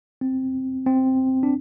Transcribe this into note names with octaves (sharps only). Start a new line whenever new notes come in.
C4
C4
D4